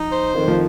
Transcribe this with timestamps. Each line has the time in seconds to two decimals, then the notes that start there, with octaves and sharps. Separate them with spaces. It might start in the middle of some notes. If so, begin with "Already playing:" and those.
Already playing: F3 D#4
0.10 C5
0.35 F2 D#3
0.48 F3